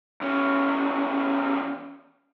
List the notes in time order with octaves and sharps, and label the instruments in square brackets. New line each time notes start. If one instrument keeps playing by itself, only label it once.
[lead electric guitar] E2 C#4